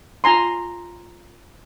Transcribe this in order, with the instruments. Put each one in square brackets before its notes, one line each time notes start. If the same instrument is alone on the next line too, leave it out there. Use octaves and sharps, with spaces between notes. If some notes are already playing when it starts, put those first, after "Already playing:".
[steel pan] F4 G#5 A#5 C6